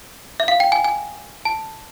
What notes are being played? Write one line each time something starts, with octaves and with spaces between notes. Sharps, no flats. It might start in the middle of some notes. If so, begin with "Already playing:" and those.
E5
F5
G5
G#5
G#5
A5